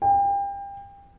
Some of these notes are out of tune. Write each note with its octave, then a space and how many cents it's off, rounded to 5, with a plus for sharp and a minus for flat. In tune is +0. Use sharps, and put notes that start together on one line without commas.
G5 +30